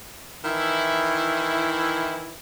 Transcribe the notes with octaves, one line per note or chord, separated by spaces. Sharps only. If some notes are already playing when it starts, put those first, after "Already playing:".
D#3 E3 E4